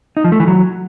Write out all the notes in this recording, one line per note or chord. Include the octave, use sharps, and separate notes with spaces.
D#4
F3
A3
E3
F#3